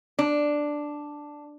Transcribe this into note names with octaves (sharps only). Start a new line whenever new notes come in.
D4